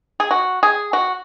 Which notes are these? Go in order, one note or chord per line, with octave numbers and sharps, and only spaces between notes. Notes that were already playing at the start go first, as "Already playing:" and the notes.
G#4
F#4
G#4
F#4